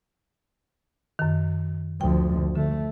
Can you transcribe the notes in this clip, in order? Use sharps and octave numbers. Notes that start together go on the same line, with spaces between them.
F#2 D#3
D2 F3 G5
D3 A3